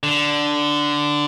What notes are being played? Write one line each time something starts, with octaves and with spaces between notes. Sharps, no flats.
D3